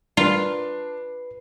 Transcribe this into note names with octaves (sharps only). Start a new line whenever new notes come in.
G3 D4 F4 A#4 B4 C7